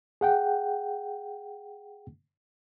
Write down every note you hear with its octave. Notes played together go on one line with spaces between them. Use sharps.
G#4 F#5 G5